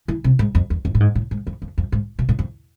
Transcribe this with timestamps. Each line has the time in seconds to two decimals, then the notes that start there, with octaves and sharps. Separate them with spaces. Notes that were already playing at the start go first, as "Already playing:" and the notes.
0.08 E3
0.24 C3
0.39 G#2
0.55 F2
0.70 E2
0.85 F2
0.95 A2
1.00 G#2
1.15 A2
1.31 G#2
1.47 F2
1.62 F2
1.78 F2
1.92 G#2
2.19 B2
2.29 A2
2.39 F2